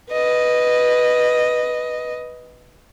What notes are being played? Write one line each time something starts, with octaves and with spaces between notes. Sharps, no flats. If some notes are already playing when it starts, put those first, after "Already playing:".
B4 D#5